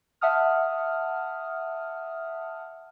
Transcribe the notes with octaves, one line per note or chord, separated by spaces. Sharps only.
E5 F#5 A5 D#6 F6